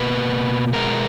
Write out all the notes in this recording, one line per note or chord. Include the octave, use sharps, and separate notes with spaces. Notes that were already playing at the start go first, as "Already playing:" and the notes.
Already playing: B2 A#3 B4
B2 G#3 B3 A#4